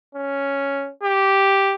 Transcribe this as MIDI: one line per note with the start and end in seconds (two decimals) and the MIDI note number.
0.15 0.89 61
1.03 1.75 67